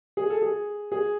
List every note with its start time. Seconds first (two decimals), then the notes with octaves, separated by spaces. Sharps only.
0.17 G#4
0.30 A4
0.42 G#4
0.92 G#4